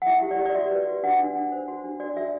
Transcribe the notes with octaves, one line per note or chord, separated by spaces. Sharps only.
F#5
E4 E5
G4
D5
G4
D5
F#4 E5
B4
F#4
D4 F#5
D4
D4
C5
F#4
D4
F#4 D5
F#4 E5